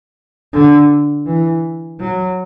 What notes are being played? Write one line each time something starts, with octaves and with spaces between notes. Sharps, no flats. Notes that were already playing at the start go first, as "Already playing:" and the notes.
D3
E3
F#3